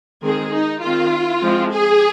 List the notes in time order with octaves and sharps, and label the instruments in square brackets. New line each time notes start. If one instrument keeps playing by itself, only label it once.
[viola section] D#3 G#3 C4 G#4
D#4
D#3 C4 F4
F3 G#3 C4
G#4